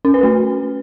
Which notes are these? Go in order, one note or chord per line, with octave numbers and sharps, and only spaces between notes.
C#4
B4
A3